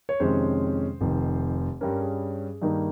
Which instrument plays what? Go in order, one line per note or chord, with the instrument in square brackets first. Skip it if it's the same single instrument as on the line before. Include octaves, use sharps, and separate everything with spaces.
[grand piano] C#5
F2 C3 D#3 G#3 C#4 C5
F1 F2 D#3
G2 G3 C#4 A#4
G#4
G2 D#3 A#3 D#4